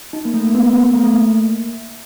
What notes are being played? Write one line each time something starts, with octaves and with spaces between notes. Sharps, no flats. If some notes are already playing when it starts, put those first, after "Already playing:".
D#4
A#3
A3
A#3
B3
A#3
B3
B3
A3
A3
A#3